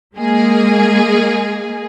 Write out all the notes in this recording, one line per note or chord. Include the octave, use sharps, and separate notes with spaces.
G#3 A#3 G#4